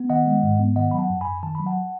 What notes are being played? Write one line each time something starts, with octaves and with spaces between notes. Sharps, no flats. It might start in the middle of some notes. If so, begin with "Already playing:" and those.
Already playing: B3
D#3 D#5 F#5
G#3
G#2
B3
D#3 D#5 F#5
F#3 B5
F#5 A5
F#2
G#5 B5
F#2
D#3 A5
F#3 B5
F#5 A5